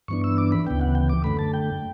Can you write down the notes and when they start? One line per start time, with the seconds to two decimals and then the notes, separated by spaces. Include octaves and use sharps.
0.08 G2 E3 B3 D4 C#6
0.24 E6
0.38 D6
0.52 B5
0.67 D2 C#3 E3 B3 G5
0.81 F#5
0.95 G5
1.09 D6
1.24 F#2 D3 A3 B5
1.39 A5
1.54 G5